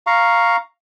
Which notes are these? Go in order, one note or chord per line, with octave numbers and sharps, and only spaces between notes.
F5 A#5 C#6